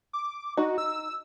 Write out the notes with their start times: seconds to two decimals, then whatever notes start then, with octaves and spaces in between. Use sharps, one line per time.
0.13 D6
0.57 D#4 F#4
0.78 E6